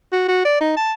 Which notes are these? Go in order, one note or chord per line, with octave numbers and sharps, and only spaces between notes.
F#4
F#4
D5
D#4
A5